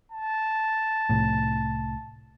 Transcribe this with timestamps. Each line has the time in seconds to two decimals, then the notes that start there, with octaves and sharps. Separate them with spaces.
0.12 A5
1.09 C2 A2